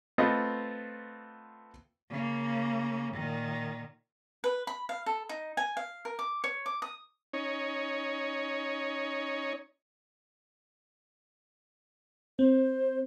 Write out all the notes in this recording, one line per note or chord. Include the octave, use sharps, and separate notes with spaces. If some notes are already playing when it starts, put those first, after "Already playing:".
A3 B3 C4 F4 D#5
C#3 A#3
A#2 D#3
B4
B5
F5
A4
D#4
G#5
F5
A#4
D6
C#5
D6
D#6
C#4 D#4 C#5
C4 C5